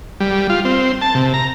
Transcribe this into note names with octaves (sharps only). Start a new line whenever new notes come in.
G3
F4
C4
A5
C3
A#5